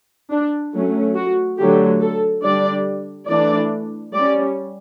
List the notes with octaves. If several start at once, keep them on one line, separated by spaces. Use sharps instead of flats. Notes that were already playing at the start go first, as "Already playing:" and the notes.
D4
F#3 A3 C#4
F#4
D3 F#3 A3 G4
A4
D3 G3 D4 D5
E3 A3 D4 D5
G3 C#4 D5